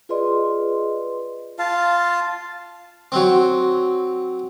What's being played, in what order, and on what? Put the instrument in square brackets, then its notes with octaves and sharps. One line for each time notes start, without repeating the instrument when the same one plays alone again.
[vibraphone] F4 G#4 B4 D5 D#5 C6
[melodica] F4 F5 A5
[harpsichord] F#3 C4